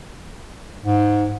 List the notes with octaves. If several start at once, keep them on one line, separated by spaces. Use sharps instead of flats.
G#2